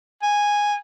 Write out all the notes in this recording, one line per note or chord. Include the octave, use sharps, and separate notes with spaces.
G#5